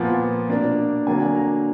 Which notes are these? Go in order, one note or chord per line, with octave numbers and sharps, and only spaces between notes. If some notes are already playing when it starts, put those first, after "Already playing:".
Already playing: A#2 F3 B3 F#5
B2 A#3 D4
D3 F#3 A#3 D4 G#5
A#5